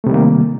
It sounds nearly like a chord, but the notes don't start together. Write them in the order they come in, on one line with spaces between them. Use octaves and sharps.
A3 C3 G3 D#3 A#3